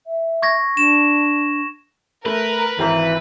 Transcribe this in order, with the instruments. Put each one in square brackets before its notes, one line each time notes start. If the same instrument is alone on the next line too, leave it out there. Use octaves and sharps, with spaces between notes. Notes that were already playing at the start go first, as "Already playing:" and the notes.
[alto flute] E5
[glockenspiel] C#6 G#6 A#6
[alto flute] D4 [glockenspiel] E7
[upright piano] A3 [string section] A#4 [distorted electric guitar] B4
[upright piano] G#1 C5 A#5 [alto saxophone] E3